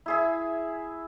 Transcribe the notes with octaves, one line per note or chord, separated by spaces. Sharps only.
E4 G#4 E5